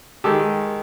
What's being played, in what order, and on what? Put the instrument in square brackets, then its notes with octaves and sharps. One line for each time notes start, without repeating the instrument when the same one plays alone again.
[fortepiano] D#3 G#3 G4 A4